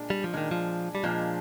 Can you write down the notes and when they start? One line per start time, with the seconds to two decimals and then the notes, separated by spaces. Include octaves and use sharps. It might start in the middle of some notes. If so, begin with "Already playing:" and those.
Already playing: A#2 G#3 D4
0.10 G3
0.24 F3
0.33 A#2 D#3 G#3 D4
0.51 F3
0.95 G3
1.04 A#2 F3 G#3 D4